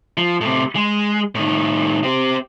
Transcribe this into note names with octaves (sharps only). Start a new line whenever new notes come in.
F3
A2 C3
G#3
A2 D#3
C4 G4